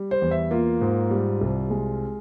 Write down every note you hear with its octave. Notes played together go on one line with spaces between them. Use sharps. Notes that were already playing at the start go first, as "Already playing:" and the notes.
Already playing: G3
C5
E2
E5
A#3 F4
G#2
G3
C2
G#3